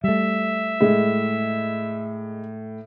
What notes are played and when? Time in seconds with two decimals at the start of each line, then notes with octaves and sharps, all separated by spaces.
0.04 G3 A3 E5
0.81 A2 G#3